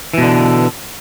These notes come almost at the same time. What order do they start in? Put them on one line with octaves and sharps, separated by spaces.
E3 B2 D3